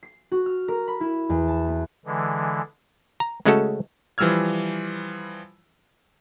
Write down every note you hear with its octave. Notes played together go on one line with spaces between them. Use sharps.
C7
F#4
F6
A#4
B5
E4
E2
A5
B3
D3 E3 G#3
A#5
C#3 G#3 A3 C#4 F#4 A4
E3 F3 G3 E6 F6 G#6